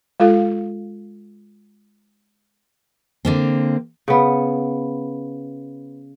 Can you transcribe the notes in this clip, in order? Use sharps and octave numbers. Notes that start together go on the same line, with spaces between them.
G#3 F4 A4 F5
D3 A#3 C4
C#3 B3